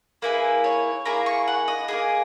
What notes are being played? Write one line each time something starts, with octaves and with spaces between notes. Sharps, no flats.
A#3 E4 G#4 B4
C#5
A#3 E4 G#4 A#5
C#6
F#5
D#5
A#3 E4 G#4